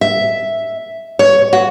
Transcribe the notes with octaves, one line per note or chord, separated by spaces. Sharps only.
E5
C#5
F#4